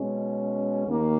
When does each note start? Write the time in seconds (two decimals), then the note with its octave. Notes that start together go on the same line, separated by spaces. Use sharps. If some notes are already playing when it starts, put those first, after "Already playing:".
Already playing: B2 G#3 C#4
0.86 D#2 D#3 A#3